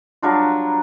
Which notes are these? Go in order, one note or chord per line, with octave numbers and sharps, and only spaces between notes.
F#3 G3 D4 F4